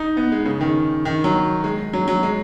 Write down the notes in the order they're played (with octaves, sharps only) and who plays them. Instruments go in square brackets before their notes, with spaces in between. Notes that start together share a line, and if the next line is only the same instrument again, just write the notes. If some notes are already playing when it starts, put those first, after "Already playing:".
Already playing: [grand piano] D#4
B3
G#3
C#3
D#3
D#3
F#3
G#3
F#3
F#3
G#3